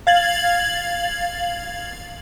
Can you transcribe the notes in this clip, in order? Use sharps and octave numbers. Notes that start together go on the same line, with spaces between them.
F5 G#6 A6 F#7